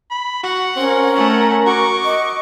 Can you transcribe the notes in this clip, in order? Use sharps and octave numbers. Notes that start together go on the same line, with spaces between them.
B5
F#4 F#5
C4 C#4 A#4
A3 F#5
F#4 C#6 D6
D#5